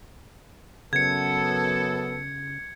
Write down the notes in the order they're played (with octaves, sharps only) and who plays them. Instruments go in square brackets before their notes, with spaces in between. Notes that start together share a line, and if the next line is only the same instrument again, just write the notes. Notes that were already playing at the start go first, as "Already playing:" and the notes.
[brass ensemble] F#2 B3 A4 [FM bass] C#3 [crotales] G#6 C#7